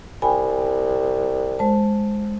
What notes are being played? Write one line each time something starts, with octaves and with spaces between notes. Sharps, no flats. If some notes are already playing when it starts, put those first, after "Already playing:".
C2 G5 G#5 B5
G#3 C5 A5